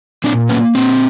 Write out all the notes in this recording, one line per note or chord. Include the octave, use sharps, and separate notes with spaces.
A#2 C4 D4
A#3 B3 C#4
A#2 C4